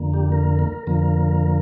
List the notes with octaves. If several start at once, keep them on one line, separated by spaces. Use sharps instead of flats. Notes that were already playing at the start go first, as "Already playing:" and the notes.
Already playing: F2 D3 A#3
G4
A#4
A#4
F2 D3 F3 A#3 A#4